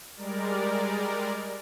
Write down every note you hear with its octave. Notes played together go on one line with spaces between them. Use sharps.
G3 G#3 A#4 D5